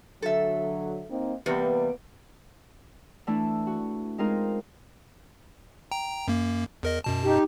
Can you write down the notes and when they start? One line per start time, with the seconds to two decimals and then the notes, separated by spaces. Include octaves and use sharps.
0.22 D3 F#3 A4 E5
1.09 A#3 C4 D#4
1.46 E2 C3 G3 A#3 B3 B4
3.27 E3 A3 D4 E4
3.67 F#4
4.18 G#3 C4 D#4 F4 G#4 A#4
5.91 G5 A#5
6.28 F#2 A#3
6.83 E2 A#4 D#5
7.04 F#2 B2 A5
7.24 D#4 G4